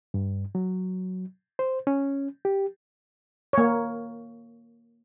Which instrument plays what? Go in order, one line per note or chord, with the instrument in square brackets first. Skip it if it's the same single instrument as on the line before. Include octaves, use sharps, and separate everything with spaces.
[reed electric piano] G2
F#3
C5
C#4
G4
[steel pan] A#3 C#5